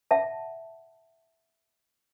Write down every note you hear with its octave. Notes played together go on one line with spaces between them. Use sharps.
E5 F#5 A5